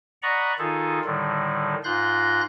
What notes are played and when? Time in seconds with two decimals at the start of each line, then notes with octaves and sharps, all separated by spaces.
0.22 D5 D#5 F#5 A#5 B5 C#6
0.58 D#3 D#4 F4 G#4 A4
1.05 A2 D3 D#3 G3
1.84 G#2 F4 C6 F#6 G6 A#6